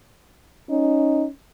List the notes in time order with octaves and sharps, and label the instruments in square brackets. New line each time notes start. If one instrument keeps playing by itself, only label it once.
[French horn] C#4 [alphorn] D#4